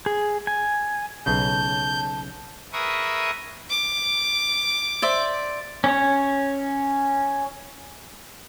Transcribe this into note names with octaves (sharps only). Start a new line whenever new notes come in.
G#4
G#5
B1 C#3 A5 G6
G#4 A#4 B4 E5 C#6 D#6
D6
C5 D5 E5
C#4 C#5